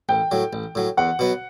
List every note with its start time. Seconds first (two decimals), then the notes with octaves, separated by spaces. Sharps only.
0.09 A1 G5
0.31 A2 F#3
0.53 A1
0.75 A2 F#3
0.97 E2 F#5
1.19 B2 F#3 B3